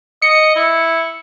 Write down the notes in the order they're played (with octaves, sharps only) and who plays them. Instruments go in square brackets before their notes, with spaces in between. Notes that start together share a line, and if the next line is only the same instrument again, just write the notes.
[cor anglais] D#5 [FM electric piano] C#7
[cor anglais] E4